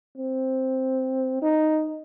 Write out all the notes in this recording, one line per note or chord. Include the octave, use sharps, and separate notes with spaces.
C4
D#4